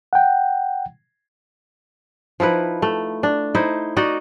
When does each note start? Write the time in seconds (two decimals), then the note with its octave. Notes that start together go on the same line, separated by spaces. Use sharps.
0.13 F#5 G5
2.40 F3 D#4 E4 B4
2.82 A3
3.23 D4
3.55 D#4 E4 C5
3.97 D#4 F#4 D5 D#5